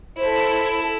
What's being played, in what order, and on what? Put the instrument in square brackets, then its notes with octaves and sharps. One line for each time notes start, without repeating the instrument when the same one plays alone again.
[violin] E4 A4 [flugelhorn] C5